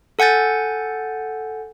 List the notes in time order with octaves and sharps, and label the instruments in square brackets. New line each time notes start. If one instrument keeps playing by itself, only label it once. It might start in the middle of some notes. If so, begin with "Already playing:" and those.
[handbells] A4 F#5 G#5 G6 A6